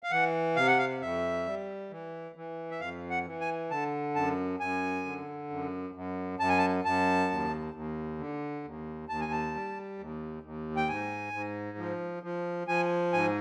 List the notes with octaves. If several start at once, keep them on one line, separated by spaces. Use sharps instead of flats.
F5
E3 F#5
C3 F5
F#5
F5
F2 E5
G3
E3
E3
E5
F2 F5
F#5
E3
G#5
D3 A5
F#2 A5
F#2 G#5
D3
F#2
F#2
F#2 A5
G#5
A5
F#2 A5
D#2
D#2
D3
D#2
D#2 A5
G#5
A5
G3
D#2
D#2
G5
G#2 G#5
G#2
F3
F3
F3 G#5
G#2 G#5